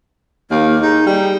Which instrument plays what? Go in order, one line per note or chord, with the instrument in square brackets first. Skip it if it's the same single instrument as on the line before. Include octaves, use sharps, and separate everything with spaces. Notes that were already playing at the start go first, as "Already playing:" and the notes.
[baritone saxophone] D#2 [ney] A#3
[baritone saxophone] D#4 [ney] G#4
[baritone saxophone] G3